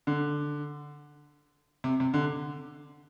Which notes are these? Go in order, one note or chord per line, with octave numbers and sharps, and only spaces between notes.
D3
C3
C3
D3